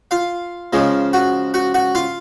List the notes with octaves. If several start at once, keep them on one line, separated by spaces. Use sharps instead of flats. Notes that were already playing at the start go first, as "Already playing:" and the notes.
F4 F5
C#3 F3 G#3
F#4 F#5
F#4 F#5
F#4 F#5
F4 F5